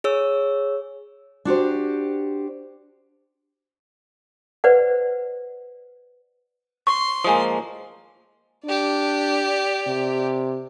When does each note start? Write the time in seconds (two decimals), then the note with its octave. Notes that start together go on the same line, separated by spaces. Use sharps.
0.04 G#4 C#5 E6
1.45 D4 F#4 G4 C5
4.64 B4 C5 D5 F#5
6.87 C6 C#6
7.24 F3 G#3 A#3 G#5 D#6
8.65 D4 G4 D5
9.87 C3